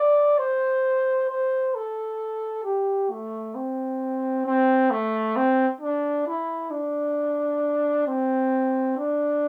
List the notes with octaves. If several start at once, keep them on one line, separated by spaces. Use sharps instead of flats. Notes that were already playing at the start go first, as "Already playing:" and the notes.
Already playing: D5
C5
C5
A4
G4
A3
C4
C4
A3
C4
D4
E4
D4
C4
D4